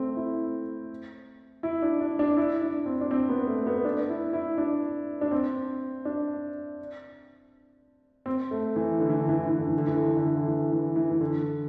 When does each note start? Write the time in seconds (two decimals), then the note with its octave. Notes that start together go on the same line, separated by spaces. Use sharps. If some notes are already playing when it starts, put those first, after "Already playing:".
Already playing: A3 C4
0.17 E4
1.63 E4
1.82 D4
2.01 D4
2.19 D4
2.37 E4
2.62 D4
2.86 C4
3.01 D4
3.11 C4
3.29 B3
3.47 A3
3.66 B3
3.85 D4
4.09 E4
4.33 E4
4.58 D4
5.21 D4
5.31 C4
6.05 D4
8.26 C4
8.51 A3
8.76 E3
9.00 D3
9.10 E3
9.19 D3
9.29 E3
9.39 D3
9.48 E3
9.58 D3
9.68 E3
9.78 D3
9.87 E3
9.97 D3
10.07 E3
10.17 D3
10.26 E3
10.36 D3
10.47 E3
10.72 E3
10.96 E3
11.11 E3
11.21 D3